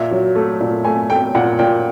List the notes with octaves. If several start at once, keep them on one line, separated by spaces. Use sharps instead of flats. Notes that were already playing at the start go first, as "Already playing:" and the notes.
Already playing: A#2 E5
F#3
A3
A#2
A3 G#5
A3 G5
A#2 F#5
A#2 G5